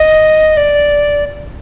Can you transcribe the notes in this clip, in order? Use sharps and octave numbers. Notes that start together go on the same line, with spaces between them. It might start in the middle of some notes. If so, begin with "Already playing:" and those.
Already playing: D#5
D5